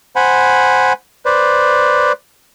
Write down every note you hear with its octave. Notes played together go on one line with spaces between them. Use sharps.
C5 F#5 G#5 B5
B4 C5 D5